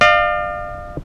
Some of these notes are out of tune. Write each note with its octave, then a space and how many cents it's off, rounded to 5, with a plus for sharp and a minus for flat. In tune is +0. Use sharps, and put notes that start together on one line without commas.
D5 +45 F5 +0